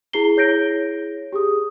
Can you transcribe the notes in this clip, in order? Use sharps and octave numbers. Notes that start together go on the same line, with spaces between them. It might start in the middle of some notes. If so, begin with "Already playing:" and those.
E4 G#4 A#5 C7 G7
E4 G#4 C#5 G6 A#6 D7
G4 G#4 D#6